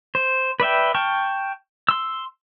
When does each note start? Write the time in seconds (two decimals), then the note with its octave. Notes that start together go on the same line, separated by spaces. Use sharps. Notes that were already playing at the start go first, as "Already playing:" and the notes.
0.15 C5
0.60 B4 D5 E5 G5
0.94 G5 A5 C#6 F6
1.89 C6 E6